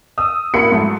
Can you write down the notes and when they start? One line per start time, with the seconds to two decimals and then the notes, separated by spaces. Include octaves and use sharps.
0.18 D#6 E6
0.54 A1 A#3 F#4 B5 C#7
0.72 G#2 F#3 A3